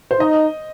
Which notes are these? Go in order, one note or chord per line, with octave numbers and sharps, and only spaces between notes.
C5
D#4 D#5